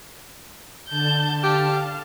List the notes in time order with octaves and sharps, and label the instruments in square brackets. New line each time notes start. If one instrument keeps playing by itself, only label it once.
[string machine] D3 A5 [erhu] G6
[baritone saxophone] G4 [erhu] F5